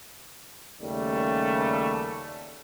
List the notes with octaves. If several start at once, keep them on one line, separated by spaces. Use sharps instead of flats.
D#2 C#3 G3 A3